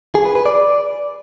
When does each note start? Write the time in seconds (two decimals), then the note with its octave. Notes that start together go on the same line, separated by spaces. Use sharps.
0.15 G#4
0.25 B4
0.35 B4
0.46 D5